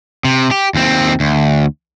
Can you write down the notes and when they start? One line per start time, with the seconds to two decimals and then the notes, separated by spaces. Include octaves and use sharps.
0.25 C3
0.51 G4
0.74 D#2 C4
1.20 D2